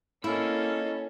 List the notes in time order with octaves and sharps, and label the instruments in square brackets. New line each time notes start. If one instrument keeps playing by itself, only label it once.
[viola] A#3 A4 [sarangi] C#4 [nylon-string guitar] E4 [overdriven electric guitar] D#5 B5